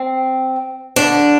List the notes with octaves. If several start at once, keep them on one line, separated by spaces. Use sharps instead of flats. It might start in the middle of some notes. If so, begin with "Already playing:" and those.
Already playing: C4
D2 D3 D4